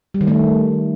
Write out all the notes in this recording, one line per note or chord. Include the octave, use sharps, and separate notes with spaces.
G3
D#3
A3